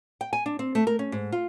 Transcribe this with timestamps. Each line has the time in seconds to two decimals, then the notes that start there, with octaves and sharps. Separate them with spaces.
0.21 G5
0.33 G#5
0.46 D4
0.59 C4
0.75 A3
0.87 A#4
0.99 C#4
1.12 G#2
1.32 F4